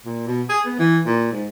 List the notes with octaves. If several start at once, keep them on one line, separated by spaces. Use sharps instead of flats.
A#2
B2
G#4
B3
E3
A#2
G#2